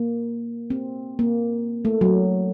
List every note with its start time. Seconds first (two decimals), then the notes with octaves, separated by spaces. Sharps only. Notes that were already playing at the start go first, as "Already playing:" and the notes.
Already playing: A#3
0.70 C4
1.19 A#3
1.85 A3
2.01 F#3